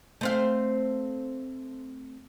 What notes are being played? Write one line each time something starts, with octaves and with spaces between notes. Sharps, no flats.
A3 C4 F5